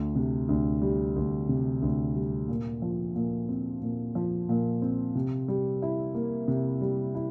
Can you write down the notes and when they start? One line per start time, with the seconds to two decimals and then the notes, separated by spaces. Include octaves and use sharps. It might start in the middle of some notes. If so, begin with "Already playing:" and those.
Already playing: D2
0.15 C3
0.49 D2
0.82 G3
1.16 D2
1.49 C3
1.82 D2
2.15 G3
2.48 A#2
2.82 F3
3.16 A#2
3.49 C4
3.82 A#2
4.15 F3
4.49 A#2
4.82 C4
5.15 C3
5.48 G3
5.82 E4
6.15 A#3
6.48 C3
6.81 G3
7.15 E4